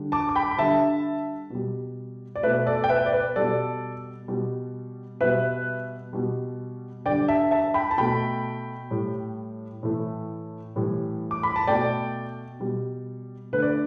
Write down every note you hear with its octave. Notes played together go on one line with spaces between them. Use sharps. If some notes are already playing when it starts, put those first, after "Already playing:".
Already playing: D3 G3
A5 D6
D6
G5 B5
B5
D3 G3 E5 A5
B2 G3
D5
B2 A3 B4 E5
A4 D5
G5
B4 E5
D5
B4
B2 G3 A4 D5
B2 G3
B2 G3 B4 E5
B2 G3
D3 G3 D5 G5
E5 A5
E5 A5
G5 B5
A5
B2 A3 G5 B5
A2 G3
A2 E3 A3
A2 E3 G3
D6
B5
A5
B2 A3 D5 G5
B2 G3
D3 A3 B4
D5